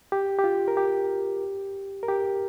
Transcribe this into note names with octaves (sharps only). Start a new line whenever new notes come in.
G4
G4
F4
A#4
G4
A#4
G4